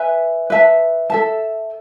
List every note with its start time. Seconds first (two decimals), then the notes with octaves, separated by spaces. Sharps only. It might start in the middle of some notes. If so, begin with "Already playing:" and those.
Already playing: B4 E5 G#5
0.50 B4 E5 A5
1.10 A4 E5 A5